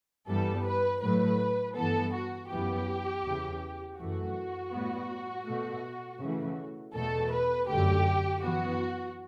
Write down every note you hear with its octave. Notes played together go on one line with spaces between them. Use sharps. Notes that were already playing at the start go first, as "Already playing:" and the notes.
G2 E3 G3 B3 A4
B4
A2 F#3 A3 B4
G2 E3 B3 A4
F#4
F#2 E3 B3 G4
E2 C#3 E3
F#2 E3 A3 F#4
A2 G3 B3
B2 A3
C#3 E3 A3
E2 B2 A3 A4
B4
F#2 D3 A3 G4
F#2 E3 B3 F#4